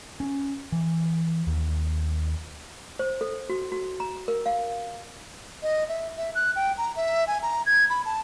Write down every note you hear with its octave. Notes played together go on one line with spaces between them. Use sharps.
C#4
E3
D#2
C5
A4
F#4
F#4
A#5
A#4
F5
D#5
E5
E5
F#6
G5
A#5
E5
G#5
A#5
G#6
B5
A5